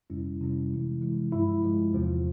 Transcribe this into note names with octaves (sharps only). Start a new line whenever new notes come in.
F2 C3 G3 C#4 E4
F2 C3 G3 C#4 E4
C3 E3 G#3 E4
C3 E3 G#3 E4
G2 F3 G#3 E4
G2 F3 G#3 E4
E2 C3 F3 C4 F4